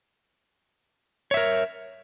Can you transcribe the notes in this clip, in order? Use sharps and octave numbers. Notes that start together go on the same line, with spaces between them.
A#4 C#5 E5